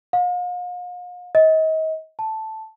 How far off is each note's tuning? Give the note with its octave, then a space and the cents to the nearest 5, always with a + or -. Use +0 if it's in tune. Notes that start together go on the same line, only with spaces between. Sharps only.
F5 +45
D#5 +35
A5 +0